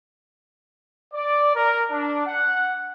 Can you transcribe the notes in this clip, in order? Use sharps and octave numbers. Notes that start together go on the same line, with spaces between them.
D5
A#4
D4
F#5